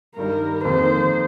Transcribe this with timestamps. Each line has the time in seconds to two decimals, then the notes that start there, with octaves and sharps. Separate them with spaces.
0.16 G2 D#3 G3 A#4
0.64 F2 D#3 A#3 C5